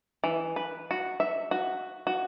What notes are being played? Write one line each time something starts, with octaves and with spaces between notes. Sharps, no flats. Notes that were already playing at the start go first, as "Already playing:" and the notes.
E3
B4
F#4
E5
F#4
F#4